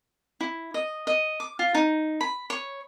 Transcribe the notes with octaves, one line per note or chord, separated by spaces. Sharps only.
E4
D#5
D#5
D6
F4
D#4
B5
C#5